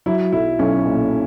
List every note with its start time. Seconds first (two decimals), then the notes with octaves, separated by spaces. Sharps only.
0.06 F#3 E4
0.33 B1 E4
0.59 B1 C#4
0.86 A#2